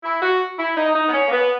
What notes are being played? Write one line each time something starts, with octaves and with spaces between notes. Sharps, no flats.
E4
F#4
E4
D#4
D#4
B3
C#4
A#3
B3